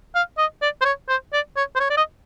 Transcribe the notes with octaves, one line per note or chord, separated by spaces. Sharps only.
F5
D#5
D5
C5
C#5
C5
D5
C#5
C5
C#5
D5
D#5